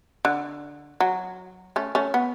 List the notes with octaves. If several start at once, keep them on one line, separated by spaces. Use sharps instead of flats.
D3
F#3
A3 C#4
A3 C#4
B3